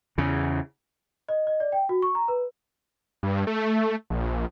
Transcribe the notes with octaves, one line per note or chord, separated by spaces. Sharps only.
E2 C#3
D#5
D#5
D5
G5
F#4
C#6
A#5
B4
G2
A3
A#1